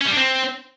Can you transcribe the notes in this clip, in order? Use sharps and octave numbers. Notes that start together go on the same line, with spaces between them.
C#4
G3
D4
C4